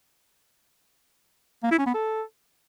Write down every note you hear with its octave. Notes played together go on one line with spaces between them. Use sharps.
A#3
E4
C#4
B3
A4